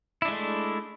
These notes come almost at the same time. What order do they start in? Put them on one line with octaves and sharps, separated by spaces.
E4 D4 G#3 A3